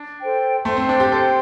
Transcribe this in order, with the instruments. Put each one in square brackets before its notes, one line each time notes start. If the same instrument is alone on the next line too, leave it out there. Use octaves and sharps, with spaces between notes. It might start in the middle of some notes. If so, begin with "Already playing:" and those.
Already playing: [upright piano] D4
[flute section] A4 C5 G5
[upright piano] A3 [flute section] C5 G5 C6
[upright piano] C4
D4
G4
[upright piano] A4 [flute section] C5 G5 C6